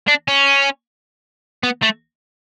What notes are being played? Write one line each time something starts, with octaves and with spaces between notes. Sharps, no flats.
D4
C#4
B3
A3